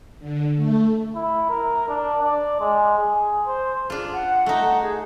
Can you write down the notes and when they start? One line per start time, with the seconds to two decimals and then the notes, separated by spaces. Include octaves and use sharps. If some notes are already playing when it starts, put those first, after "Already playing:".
0.19 D3
0.56 A3
1.15 E4
1.50 A#4
1.89 D4
2.23 D5
2.60 G#3
2.97 G#4
3.47 C5
3.90 D4 F4 G#4
4.12 F#5
4.46 A3 D#4
4.82 G#4